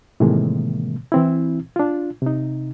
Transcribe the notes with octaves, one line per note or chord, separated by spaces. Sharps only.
A2 C3 D#3 E3 G#3 A#3
E3 C4 E4
D4 F4
C3 D#4